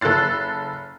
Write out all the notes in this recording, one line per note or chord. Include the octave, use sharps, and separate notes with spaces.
F#1 A4 E6 F#6 A6 C7